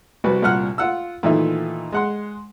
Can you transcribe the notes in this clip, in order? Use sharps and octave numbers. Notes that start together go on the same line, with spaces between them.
C2 F#4 B4
C2 A#2 F#5 F6 F#6
F4 F#5 E6
A#2 D#3 E3 A3 D#4 E5
G#3 F#5 C6